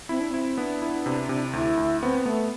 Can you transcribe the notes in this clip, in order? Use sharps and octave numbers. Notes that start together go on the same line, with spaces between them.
C4 E4
D4
C4 E4
B3 D4
E4
C3
C3
D2 E4
D2
B3 C4
A3 B3